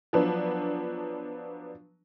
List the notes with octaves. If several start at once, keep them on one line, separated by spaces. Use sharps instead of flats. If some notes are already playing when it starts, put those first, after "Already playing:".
F3 F#3 B3 D4 B4